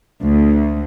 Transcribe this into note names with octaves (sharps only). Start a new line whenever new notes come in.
D2